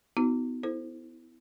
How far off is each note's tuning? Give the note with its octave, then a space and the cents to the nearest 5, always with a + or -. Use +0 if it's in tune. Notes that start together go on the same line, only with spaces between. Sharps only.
B3 +30 D#4 +35 F#4 +0
E4 -10 A4 +0 C5 +0